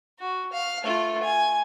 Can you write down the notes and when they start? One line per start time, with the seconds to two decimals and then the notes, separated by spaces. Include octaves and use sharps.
0.19 F#4
0.52 F5
0.83 A3 F4
1.23 G#5